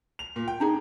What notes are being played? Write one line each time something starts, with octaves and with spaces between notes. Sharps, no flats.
F7
A#2
G5
D4 D#4 G#4